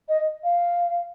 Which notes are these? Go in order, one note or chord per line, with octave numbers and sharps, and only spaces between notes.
D#5
F5